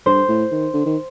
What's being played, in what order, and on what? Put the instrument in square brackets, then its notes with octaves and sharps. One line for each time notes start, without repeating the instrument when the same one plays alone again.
[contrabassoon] G2 [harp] C5
[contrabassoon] A2
D#3
D3
D#3